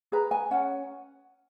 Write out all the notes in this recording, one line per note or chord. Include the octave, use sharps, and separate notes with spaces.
G#4 B4 A#5
G#5
C#4 F#5